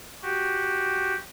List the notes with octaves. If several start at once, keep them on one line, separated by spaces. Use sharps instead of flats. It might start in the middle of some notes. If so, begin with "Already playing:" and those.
F#4 G4